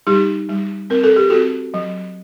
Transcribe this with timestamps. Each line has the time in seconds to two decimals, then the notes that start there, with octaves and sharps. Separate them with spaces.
0.07 G3 D#4 G4
0.49 G3
0.90 C4 A#4
1.03 A4
1.16 G4
1.30 C4 F#4 A4
1.74 F#3